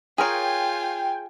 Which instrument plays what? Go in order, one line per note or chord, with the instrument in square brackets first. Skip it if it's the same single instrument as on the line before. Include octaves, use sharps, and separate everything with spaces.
[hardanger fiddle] F4 G#5 [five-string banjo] G#4 A#4 C#5 [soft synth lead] G5